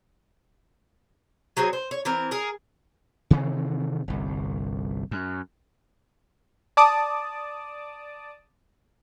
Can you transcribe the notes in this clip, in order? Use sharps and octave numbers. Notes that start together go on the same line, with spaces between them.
F#3 C4 G#4 C#5
C5
C#5
E3 C4 A#4
G#4 A#4
C3 D#3 E3 C4
G1 C2
F#2
D5 A5 D6 D#6